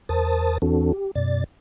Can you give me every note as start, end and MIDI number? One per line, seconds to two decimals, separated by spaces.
0.09 0.58 40
0.09 0.58 70
0.09 0.58 72
0.09 0.58 81
0.09 0.58 87
0.09 0.58 93
0.62 0.92 40
0.62 0.92 52
0.62 0.92 60
0.62 0.92 62
0.62 0.92 66
0.62 0.92 69
0.93 1.11 67
1.15 1.44 42
1.15 1.44 47
1.15 1.44 74
1.15 1.44 93